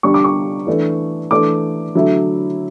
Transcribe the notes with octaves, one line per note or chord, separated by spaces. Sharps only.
D3 G3 D4 C#6
D6
C#6
E3 A3 D4
E3 A3 D4 D6
D3 F#3 A3 E4